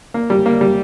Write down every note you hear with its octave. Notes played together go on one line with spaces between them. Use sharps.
A#3
G3
A#3
G3